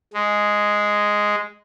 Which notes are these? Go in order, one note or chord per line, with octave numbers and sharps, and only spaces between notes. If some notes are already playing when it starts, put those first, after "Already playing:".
G#3